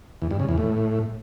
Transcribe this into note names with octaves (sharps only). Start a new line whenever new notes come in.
E2
G2
C#3
E2
A2